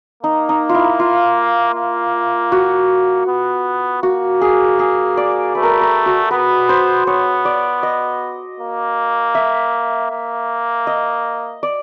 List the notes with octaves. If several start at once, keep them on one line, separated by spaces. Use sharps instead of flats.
A#3 D#4
D#4
F4
E4
F4
A#3
F#4
B3
A#3 F#4
G#4
G#4
D5
A3 B4
A#4
B4
A#4
F#4
B3 B4
C5
B3 C#5
D5
D#5
A#3
E5
A#3
D#5
D5